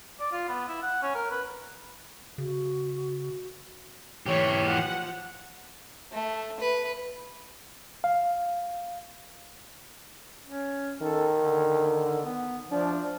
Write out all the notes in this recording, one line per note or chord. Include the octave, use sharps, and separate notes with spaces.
D5
F4
B3
E4
F#5
C#4
A#4
B4
C#3 F#4
E3 G4 C#5
F3 F#5
A3
B4
F5
C#4
D#3 A4
D3
B3
F3 D4